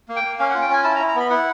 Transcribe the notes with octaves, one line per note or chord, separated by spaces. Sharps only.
A#3
G5
A#3
C#4 F5
F#5
F4
G5
C#4 G#5
E4 A5
A#5
E4
A#5
B3 B5
E4 F#5